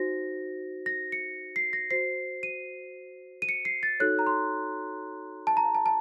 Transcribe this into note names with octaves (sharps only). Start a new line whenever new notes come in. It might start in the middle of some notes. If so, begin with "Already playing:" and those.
Already playing: D#4 F#4 C5 A#6
A#6
C#7
C7
A#6
F#4 C5 C7
D#7
D#7
C#7
C7
A6
D#4 F#4 A4 C#5 F#6
A#5
C6
A5
A#5
A5
A5